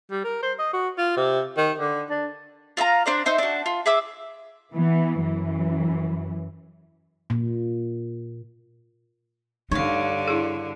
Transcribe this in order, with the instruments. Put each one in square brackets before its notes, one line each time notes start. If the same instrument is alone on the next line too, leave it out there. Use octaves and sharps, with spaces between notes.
[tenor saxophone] G3
A#4
C5
D#5
F#4
F4
C3
D#3
D3
D4
[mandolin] F4 E5 F5 A#5
D4 C5 D5
D#4 C5 E5
D4 F#4
F4
G#4 E5 D6 E6
[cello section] E3 B3
F#2 E3
[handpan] A#2
[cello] G2 D3 [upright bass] D#4 [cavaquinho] C#5 F5
[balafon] E4 G#4